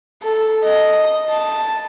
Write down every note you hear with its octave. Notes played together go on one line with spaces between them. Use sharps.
A4
D#5
A5